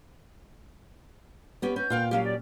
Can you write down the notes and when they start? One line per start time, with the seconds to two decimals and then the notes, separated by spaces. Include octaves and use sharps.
1.62 B3 C#4 G4
1.76 C#4 G6
1.90 A#2 F4 F5 G5
2.11 F#3 C#4 G4 F5
2.24 D5